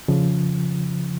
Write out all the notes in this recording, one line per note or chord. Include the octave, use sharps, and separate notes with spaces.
C#3 F3